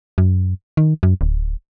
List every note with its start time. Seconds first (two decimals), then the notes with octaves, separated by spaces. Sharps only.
0.18 F#2
0.77 D#3
1.03 F#2
1.21 D1